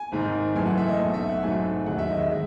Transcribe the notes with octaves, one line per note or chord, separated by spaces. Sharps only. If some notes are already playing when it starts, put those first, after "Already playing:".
Already playing: G#5
G#1 G#2 D#3
F#1 F#2 E3 A3 G#5
F#5
E5
D#5
B1 B2 A3
E5
F#5
G#1 G#2 F#3 A3 G#5
E1 D#2 D#3 F#3 F#5
E5
D#5
E5
G#3